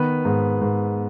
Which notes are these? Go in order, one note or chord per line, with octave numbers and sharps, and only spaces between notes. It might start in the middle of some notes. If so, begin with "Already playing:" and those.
Already playing: D#3 B3 B4
G#2
G#2